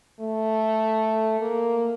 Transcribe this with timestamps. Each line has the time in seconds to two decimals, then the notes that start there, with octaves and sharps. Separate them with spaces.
0.20 A3
1.41 A#3